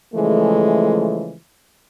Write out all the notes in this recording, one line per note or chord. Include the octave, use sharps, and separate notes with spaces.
C#3 E3 F3 G#3 A3